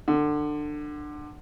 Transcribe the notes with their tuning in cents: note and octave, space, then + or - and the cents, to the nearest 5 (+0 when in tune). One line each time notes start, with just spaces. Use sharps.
D3 +25